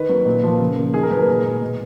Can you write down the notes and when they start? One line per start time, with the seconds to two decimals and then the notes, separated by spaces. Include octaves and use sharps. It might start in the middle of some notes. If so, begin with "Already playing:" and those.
Already playing: D#3 B4
0.09 F#3 A#3
0.26 A#2
0.43 F3 A#3
0.60 C#3
0.77 F3 A#3
0.94 D#3 G#4
1.03 A#4
1.11 F#3 A#3 B4
1.19 A#4
1.28 A#2 G#4
1.45 G#3
1.61 B2